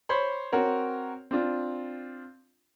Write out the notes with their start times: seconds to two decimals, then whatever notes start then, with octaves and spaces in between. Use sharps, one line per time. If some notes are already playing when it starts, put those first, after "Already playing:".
0.09 C5 C#5 B5 C6
0.52 C4 F#4 A#4 C#5
1.31 C4 D4 F4